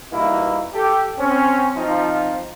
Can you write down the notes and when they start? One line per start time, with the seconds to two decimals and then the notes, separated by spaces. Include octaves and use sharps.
0.12 B2 E3 G3 A#3 D#4 E4
0.74 G4 A4
1.18 C4 C#4
1.77 F3 C4 D#4